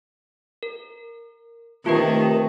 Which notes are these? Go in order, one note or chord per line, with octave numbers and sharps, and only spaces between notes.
A#4
C3 D#3 A3 F4 G4 B4